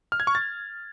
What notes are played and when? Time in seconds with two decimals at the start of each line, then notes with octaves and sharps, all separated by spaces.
0.12 F6
0.20 G#6
0.27 C#6
0.35 A6